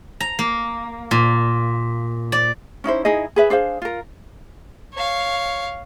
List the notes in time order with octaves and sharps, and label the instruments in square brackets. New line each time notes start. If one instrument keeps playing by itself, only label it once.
[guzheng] A#5
A#3
A#2
D5
[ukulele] C#4 D#4 E4 C5
D#4 E4 G#4 D#5
G#4 B4 E5
D4 G#4 C5 F5
F4 A#4
[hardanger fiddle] C#5 F5